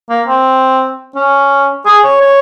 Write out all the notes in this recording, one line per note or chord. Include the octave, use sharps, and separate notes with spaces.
A#3
C4
C#4
G#4
C#5
C#5